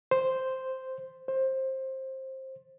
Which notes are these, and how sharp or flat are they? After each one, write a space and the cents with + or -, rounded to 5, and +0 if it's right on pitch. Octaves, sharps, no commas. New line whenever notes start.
C5 -5
C5 +15